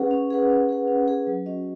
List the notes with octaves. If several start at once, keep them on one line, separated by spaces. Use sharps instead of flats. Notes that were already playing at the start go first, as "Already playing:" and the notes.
Already playing: C#4 G#4 B4 F#5
C#4
G#4 B4 F#5
C#4
G#4 B4 F#5
C#4
G#4 B4 F#5
F#3
C#4 F#4 D#5